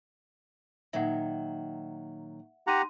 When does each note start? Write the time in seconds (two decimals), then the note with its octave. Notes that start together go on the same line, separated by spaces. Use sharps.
0.93 A#2 D#3 F#3 E5 F#5
2.67 D#4 G4 F#5 A#5 C6 D#7